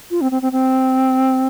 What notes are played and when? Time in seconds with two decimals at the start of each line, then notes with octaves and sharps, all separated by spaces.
0.11 F4
0.21 C4
0.31 C4
0.42 C4
0.52 C4